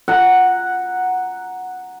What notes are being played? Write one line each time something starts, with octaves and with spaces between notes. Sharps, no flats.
F#5 A#5